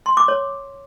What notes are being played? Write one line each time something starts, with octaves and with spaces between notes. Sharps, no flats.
C6
D6
C#5